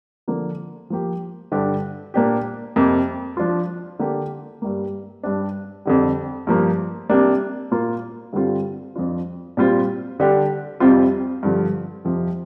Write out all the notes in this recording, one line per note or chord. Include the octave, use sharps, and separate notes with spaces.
D3 F3 A#3
F3 A#3 G4
G2 D3 G3 D4 G4
A#2 A#3 D4 G4
F2 C3 A#3
F3 D4 F4
D3 A#3 G4
G2 G3 A#3
G2 G3 D4
F2 D3 G3
G2 F3 A#3
C3 G3 A#3 D4
A#2 A#3 F4
G2 D3 G3 C4 F4
F2 F3 D4 F4
A#2 G3 C4 F4
D3 G3 D4 G4
F2 C3 G3 C4 F4
G2 D3 F3
F2 C3 F3